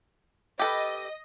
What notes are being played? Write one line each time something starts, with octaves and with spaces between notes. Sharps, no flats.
G4 A4 B4 D#5